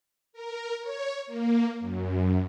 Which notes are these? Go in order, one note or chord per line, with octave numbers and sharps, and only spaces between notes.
A#4
C#5
A#3
F#2